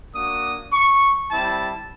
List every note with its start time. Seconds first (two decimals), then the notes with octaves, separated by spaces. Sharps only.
0.14 A#3 D4 F#4 D#6
0.73 C#6
1.30 G3 C4 E4 A5